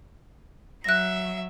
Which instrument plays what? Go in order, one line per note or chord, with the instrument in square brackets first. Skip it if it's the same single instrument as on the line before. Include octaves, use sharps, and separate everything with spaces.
[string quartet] F#3 E5 [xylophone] F#6 A#6